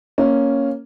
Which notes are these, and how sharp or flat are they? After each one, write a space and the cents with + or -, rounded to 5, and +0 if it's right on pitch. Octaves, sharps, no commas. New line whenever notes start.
A#3 +0 C#4 +0 A#4 +0